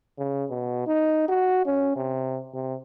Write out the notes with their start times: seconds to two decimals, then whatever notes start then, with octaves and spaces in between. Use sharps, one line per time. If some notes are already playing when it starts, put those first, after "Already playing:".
0.18 C#3
0.50 B2
0.87 D#4
1.29 F#4
1.66 C#4
1.96 C3
2.54 C3